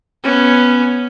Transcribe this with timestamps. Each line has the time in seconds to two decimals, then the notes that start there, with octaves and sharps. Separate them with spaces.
0.23 B3 C#4